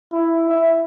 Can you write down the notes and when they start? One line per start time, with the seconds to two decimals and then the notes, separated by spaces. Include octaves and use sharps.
0.12 E4
0.49 E5